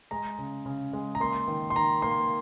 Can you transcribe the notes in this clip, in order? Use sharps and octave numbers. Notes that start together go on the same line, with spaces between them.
G#3 A#5
C#3
C#3
G#3
A#5
A#3 C6
D#3
C6
D#3 A#5
A#3 C6